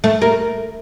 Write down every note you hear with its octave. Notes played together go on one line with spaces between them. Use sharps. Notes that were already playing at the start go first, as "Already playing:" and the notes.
A3
A#3